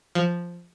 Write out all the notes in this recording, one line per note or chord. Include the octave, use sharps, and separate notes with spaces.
F3